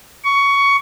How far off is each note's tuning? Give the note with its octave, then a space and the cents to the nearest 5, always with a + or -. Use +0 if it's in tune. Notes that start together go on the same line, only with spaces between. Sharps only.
C#6 +15